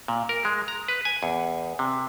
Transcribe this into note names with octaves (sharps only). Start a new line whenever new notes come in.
A#2
A#4
G#3
A#5
B4
G#5
E2
C3